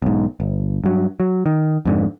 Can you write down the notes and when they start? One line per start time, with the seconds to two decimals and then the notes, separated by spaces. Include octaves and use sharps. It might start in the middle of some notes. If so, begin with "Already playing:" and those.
0.02 B1 G#2
0.40 G1
0.84 G2 F#3
1.20 F#3
1.46 D#3
1.85 F2 G#2 D3